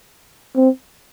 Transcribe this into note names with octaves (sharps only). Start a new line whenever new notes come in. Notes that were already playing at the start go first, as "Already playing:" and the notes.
C4